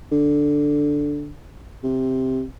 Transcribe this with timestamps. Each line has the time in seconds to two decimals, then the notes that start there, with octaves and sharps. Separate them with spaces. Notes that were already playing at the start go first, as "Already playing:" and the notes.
0.12 D3
1.83 C3